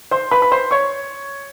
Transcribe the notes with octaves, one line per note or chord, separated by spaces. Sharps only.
C5 C6
B4 B5
B5
C5 C6
C#5 C#6